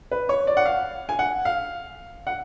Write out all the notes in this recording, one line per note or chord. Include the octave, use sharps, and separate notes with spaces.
B4
C#5
D5
F#5
F5
G#5
F#5
F5
F#5